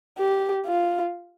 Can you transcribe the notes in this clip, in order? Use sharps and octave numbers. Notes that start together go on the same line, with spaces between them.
G4
F4